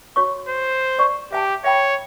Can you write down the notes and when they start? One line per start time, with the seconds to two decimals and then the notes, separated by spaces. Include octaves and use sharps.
0.16 F#4 C#5 C#6
0.48 C5
0.99 D5 C#6
1.33 G4 E5 G#5 A5
1.64 C#5 E5 G5 B5